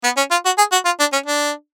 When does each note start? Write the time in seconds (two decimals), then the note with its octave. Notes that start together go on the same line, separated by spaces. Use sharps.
0.04 B3
0.17 C#4
0.31 F4
0.45 F#4
0.58 G#4
0.72 F#4
0.85 F4
1.00 D4
1.13 C#4
1.26 D4